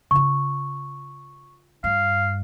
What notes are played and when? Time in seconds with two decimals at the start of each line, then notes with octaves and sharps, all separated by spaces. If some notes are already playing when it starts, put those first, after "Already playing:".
0.11 C#3 F4 C#6
1.84 G2 F5